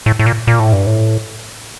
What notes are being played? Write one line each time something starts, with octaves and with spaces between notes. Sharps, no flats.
A2
A2
A#2
A#2
A2
G2
A2